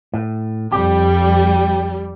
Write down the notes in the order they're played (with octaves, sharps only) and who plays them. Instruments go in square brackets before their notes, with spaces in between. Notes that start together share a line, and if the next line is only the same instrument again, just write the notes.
[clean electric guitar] A2
[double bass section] F2 [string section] G3 [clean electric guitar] G4